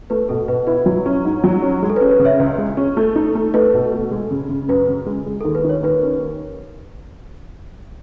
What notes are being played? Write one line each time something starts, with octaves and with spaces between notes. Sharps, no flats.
A3 B4
B2 A4
B2 B4
E4 B4
F#3
C#4
G#2
F#3
C#4
G#3
A4
B4
C#4
B4
C#3
C#5 E5
C#2
G#3
C#4
A3
D#4
A3
A3 B4 D#5
B2
A3
G#3
C#3
C#3
F#2 B4
C#3
G#3
G#3
A4
D#2
B4
D#3 C#5
D#2 B4
C#4